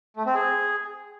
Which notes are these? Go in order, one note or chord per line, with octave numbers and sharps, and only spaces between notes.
A3
C4
G#4